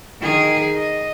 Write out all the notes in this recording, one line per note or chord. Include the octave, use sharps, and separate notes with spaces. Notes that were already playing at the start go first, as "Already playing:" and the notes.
D#3 G#4
D#5